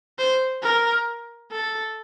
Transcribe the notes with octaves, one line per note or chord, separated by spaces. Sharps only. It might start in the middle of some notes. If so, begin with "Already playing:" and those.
C5
A#4
A4